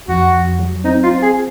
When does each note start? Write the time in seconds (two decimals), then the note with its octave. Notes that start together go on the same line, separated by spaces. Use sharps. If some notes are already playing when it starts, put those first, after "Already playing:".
0.08 F2 F#4
0.34 F2
0.59 F#3
0.84 C4 D#4
1.03 F4
1.10 C4
1.22 G#4